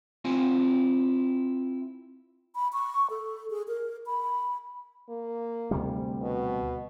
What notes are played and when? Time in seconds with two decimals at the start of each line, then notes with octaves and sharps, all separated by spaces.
0.25 C4 E4 F4 G#5
2.55 B5
2.73 C#6
3.10 A4
3.50 G#4
3.68 A#4
4.06 B5
5.09 A#3
5.71 D2 C3 G3
6.22 B2